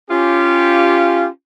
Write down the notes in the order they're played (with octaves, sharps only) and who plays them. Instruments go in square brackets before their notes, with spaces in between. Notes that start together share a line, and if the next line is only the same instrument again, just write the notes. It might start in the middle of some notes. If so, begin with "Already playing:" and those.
[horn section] C#4 F4 G4